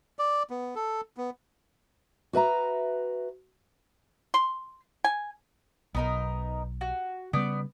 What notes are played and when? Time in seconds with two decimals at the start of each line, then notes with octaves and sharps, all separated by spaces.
0.19 D5
0.50 B3
0.76 A4
1.17 B3
2.33 F#4 B4 E5 A#5
4.34 C6
5.04 G#5
5.95 B1 B3 D#4 A#4
6.81 F#4
7.33 C#3 G3 B3 D5 G6